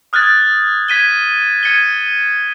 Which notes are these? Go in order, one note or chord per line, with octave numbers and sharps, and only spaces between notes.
D#6 F6 F#6 G#6 A6
G#6 B6 D#7 G7
G#6 C#7 D#7 G7